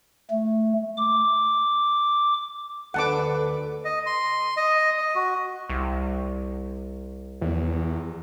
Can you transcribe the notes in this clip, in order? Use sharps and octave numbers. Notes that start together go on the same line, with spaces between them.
A3
D6
D2 D4 A4 B4 F#5 A5 D6
D#5
C6
D#5
D#5
F#4
C2
E2